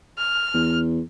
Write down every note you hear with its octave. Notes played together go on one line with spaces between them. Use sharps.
F6
E2